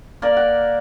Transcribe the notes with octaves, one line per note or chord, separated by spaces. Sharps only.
A#3 A#4 D5
F#5